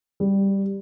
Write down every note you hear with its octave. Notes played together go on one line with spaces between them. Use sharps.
G3